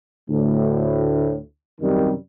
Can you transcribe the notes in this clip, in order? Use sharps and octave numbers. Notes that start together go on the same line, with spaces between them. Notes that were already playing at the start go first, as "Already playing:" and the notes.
D2 A2
F#2 C3 D#3 G3